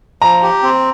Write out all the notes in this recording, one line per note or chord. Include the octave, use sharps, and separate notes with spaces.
F3 A#5
G4
C4